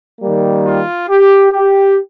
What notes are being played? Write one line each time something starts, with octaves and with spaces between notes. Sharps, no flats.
D#3 G3 A#3
F4
G4
G4